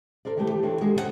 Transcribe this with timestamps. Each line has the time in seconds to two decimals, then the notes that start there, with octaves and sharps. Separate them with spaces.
0.25 A4 A#4 C5 D5
0.37 D#3 E3 G3 A3 G4 A5
0.51 G4
0.63 D#3 E3 D4 F4 A4 C#5
0.81 G#3 A#3 F#4 G4 A4
0.94 F2 C#3 D4 D#4 A4 F#5